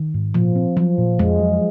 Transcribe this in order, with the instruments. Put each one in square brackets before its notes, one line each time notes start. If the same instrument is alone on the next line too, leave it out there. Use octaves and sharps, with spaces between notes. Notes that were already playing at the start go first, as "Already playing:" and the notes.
Already playing: [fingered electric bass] D#3
G#2
[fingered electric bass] A#2 [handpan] F3
[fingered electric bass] C4
[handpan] F3 [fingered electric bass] F#3
[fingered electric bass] A#2
[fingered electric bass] F2 [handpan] G#3
[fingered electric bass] F#3